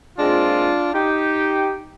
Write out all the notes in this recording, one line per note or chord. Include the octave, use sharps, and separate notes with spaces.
A#2 G#3 C4 D4 F4
D#4 G4